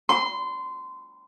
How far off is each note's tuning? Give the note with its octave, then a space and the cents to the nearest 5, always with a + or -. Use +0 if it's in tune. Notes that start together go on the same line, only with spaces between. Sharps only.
C6 -20